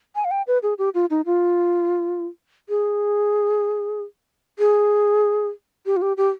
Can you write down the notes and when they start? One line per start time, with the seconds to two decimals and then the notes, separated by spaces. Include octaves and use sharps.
0.15 G#5
0.25 F5
0.31 G5
0.47 B4
0.63 G#4
0.78 G4
0.95 F4
1.10 D#4
1.26 F4
2.69 G#4
4.59 G#4
5.86 G4
5.96 F4
6.02 G4
6.17 G4